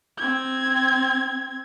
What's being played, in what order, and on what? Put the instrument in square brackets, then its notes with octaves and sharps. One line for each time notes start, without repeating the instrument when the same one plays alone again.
[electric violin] C4 G#6